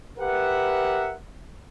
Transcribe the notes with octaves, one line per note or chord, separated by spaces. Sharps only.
G4 A#4 B4 E5 F#5